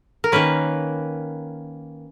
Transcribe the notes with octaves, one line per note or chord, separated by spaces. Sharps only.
A#4
D#3 A#3 C#4 B4